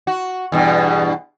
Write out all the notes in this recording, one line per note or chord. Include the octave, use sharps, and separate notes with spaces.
F#4
E2 G2 B2